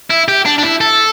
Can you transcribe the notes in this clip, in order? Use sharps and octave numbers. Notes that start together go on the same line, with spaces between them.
E4
G4
D4
D4
E4
A4